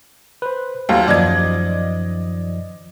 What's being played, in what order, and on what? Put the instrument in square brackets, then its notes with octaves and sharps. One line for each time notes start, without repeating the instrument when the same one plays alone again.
[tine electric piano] B4 C5
[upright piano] D#2 F#3 F4 [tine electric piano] A3
[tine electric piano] F#2 D#3 F3 [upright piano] D5 D#5 G#6